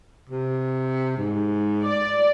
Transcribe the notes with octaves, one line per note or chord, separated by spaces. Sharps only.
C3
G#2
D5